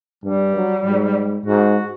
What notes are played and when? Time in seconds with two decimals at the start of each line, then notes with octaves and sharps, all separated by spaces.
0.24 G2 G3
0.56 F#3
0.85 G#2
1.46 G#2 F#4